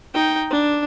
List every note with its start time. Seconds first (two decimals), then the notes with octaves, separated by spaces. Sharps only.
0.14 D#4 G5
0.50 D4